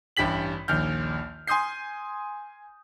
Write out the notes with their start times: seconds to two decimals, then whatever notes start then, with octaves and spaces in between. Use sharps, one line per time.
0.17 A1 G2 G4 B6 F#7
0.68 A#1 D#2 F6 G6
1.47 G#5 C6 D#6 G6 C7